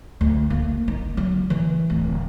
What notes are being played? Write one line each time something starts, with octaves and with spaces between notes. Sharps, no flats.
D2
A#3
D#4
F#3
E3
D1